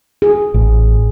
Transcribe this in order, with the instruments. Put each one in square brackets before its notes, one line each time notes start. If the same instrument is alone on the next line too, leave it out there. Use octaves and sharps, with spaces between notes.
[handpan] G#4
[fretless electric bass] A1